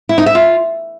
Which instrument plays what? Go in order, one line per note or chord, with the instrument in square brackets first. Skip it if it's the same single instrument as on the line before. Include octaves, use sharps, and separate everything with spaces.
[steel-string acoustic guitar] E4
D#4
E5
F4